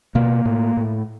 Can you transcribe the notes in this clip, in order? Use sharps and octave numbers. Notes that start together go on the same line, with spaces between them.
B2 A#3
A2
A2